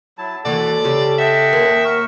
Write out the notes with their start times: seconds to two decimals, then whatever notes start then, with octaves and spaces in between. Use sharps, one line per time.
0.18 F#3 E4 A5
0.45 D#2 E3 G#3 F#4 A4 D5
0.84 C#3 G4
1.19 D#5 E5 F#5 G5
1.53 D#2 A#3
1.85 A#4 C#6